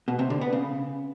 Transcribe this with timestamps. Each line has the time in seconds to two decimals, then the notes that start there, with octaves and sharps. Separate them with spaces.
0.08 B2
0.19 C3
0.30 D3
0.41 B3
0.53 C#3